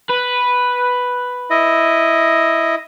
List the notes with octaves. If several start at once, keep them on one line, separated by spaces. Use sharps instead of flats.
B4
E4 D#5